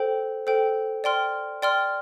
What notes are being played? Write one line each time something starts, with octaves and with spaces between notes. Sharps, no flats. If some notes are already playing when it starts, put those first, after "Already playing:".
Already playing: A4 C5 G5
A4 C5 G5
D5 G5 C6 F6
D5 G5 C6 F6